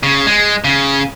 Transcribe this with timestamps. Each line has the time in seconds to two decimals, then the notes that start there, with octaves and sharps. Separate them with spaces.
0.03 C#3
0.27 G#3
0.64 C#3